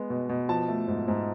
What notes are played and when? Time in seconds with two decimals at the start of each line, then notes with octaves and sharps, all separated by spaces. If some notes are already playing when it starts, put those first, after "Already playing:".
Already playing: G#3 B3
0.10 B2
0.29 B2
0.49 F3 A5
0.68 A3
0.88 G#2
1.08 G#2